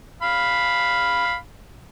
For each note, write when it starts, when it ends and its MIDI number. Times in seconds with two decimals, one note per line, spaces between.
0.22 1.35 77
0.22 1.35 83